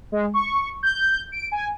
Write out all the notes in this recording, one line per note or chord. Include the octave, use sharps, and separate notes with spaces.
G#3
C#6
G6
D7
G#5